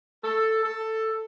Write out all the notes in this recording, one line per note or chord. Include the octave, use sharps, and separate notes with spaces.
A4
A4